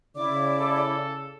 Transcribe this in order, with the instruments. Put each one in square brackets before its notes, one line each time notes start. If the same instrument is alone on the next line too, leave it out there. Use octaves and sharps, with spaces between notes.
[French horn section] C#3 [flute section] E4 D5 D6
[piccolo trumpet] A4